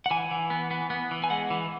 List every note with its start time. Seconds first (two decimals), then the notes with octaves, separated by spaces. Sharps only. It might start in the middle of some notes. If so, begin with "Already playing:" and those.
0.06 F#5
0.10 E3 G#5
0.31 E3
0.50 B3
0.71 B3
0.90 B3
1.11 E3
1.24 G#5
1.30 G#3 F#5
1.50 E3